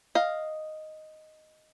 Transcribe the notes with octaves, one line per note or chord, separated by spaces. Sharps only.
D#5 F5